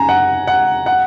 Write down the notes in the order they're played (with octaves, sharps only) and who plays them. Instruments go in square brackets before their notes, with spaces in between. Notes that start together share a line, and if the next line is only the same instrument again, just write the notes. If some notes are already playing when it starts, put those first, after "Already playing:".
Already playing: [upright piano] F#2 C#3 D#4 [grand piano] G#5 A#5
[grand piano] F#5
F#5
F#5